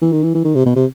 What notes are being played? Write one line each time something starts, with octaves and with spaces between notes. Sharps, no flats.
E3
D#3
E3
E3
D#3
C3
B2
C3